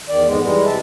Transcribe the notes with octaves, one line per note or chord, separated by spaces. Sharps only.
E2 D#3 D5
F2 G#2 G#3 B3
E3 G3 G#3
C3 E5 A5